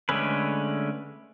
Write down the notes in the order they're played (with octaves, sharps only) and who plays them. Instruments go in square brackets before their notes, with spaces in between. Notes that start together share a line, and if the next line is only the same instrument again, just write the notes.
[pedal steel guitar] D3 G#3 A3 C#4 B4